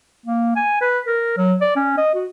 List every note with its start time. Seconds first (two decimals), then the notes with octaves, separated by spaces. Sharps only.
0.26 A#3
0.56 G#5
0.81 B4
1.06 A#4
1.37 F#3
1.61 D5
1.76 C#4
1.97 D#5
2.15 F#4